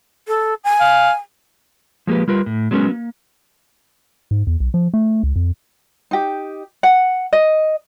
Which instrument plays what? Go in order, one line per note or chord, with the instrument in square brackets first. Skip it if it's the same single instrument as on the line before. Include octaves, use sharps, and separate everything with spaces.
[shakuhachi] A4
G#5
[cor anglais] F5
[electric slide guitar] F3 G#3 A#3 G4 B4
G3 F4 A#4 B4
A2
F#3 G#3 B3 C#4 A#4
A#3
[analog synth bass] G#2
E2
B1
F3
A3
C#2
F2
[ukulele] D#4 G4
F#5
D#5